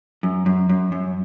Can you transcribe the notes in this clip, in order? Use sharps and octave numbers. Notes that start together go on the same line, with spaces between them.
F#2
F#2
F#2
F#2